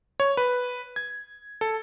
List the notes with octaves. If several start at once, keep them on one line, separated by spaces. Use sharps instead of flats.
C#5
B4
G#6
A4